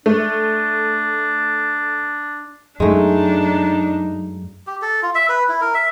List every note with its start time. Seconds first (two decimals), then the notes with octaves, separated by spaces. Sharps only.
0.06 A3 D4
2.80 F#2 G#3 A3 D4 D#4
4.67 G4
4.82 A4
5.02 F4
5.15 E5
5.29 B4
5.49 E4
5.61 A#4
5.74 E5